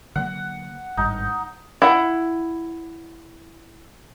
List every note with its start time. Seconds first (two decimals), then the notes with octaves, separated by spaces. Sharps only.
0.16 D3 F#3 A#3 F#5
0.97 G#1 G2 D#4
1.82 E4 F#5